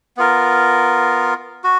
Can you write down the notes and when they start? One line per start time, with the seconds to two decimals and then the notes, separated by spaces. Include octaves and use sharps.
0.17 B3 F4 A#4
1.64 F#4